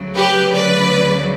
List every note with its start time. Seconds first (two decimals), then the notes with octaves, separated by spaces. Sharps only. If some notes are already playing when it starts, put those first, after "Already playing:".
Already playing: D2 C#3 F#3
0.16 G4 B4
0.53 B4 D5